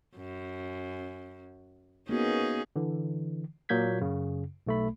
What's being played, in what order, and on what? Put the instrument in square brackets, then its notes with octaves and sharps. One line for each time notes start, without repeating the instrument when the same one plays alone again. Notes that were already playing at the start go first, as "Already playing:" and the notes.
[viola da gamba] F#2
[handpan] A#3 B3 F#4 [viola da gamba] C#4 D#4 G#4
[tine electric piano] D3 E3
A#2 F#3 A#3 G6 G#6 B6
F#2 C#3
B1 A3 B5